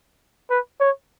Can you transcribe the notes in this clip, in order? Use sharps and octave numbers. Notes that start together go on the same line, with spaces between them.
B4
C#5